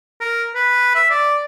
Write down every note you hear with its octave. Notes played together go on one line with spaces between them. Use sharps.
A#4
B4
E5
D5